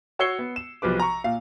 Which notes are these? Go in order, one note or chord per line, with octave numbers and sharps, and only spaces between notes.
F#4 C#5 E6 C7 C#7 G7
B3
E7
B1 C3 F3 B4 D6
A#5 C#6
A#2 F5